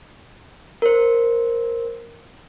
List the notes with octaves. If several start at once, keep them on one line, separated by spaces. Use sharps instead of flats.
A#4 C5